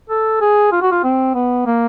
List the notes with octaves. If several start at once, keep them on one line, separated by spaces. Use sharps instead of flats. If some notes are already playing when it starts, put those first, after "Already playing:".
A4
G#4
F4
F#4
F4
C4
B3
A#3